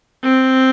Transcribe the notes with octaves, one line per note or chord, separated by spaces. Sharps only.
C4